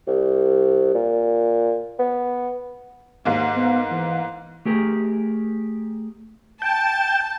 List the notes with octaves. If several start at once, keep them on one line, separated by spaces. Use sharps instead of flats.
C2
A#2
B3
D#2 G#2 A#3
B3
E3
A3 G4 G#4 A#4
G5 A5